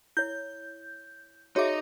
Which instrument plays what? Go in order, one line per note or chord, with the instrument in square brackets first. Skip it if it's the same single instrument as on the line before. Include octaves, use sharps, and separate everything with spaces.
[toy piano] E4 C#5 [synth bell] G6
[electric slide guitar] D#4 [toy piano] F#4 G#4 E5 [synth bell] C#5 D6